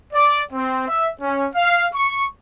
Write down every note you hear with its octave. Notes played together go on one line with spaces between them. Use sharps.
D5
C4
E5
C#4
F5
C#6